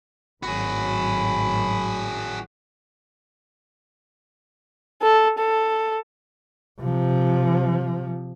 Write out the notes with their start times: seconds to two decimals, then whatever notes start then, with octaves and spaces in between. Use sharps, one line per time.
0.43 G#1 A2 F#3 F#4 G#4 B5
5.03 A4
5.38 A4
6.82 C3 F3